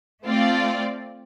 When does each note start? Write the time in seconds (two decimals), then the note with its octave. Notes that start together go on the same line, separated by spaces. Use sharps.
0.23 A3 C4 F4 D5